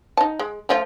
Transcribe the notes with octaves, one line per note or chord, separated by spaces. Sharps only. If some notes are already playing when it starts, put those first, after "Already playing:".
D#4 A5
G#3
F3 A3 F4